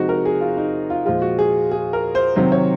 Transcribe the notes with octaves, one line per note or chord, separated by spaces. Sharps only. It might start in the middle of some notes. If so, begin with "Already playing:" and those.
Already playing: C3 F3 G#3 D#4 F#4
A#4
G#4
F4
D#4
F4
A#2 F3 G#3 F4
F#4
G#4
G#4
A#4
C5
C3 D#3 F#3 C5
C#5